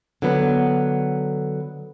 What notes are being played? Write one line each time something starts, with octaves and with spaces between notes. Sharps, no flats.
D3 F#3 B3